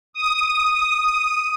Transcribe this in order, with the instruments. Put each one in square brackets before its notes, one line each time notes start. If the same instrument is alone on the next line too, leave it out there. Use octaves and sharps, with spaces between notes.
[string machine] D#6